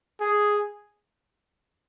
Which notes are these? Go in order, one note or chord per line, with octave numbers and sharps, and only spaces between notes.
G#4